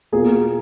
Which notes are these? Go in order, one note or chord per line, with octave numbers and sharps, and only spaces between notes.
B2 A#3 F4 G#4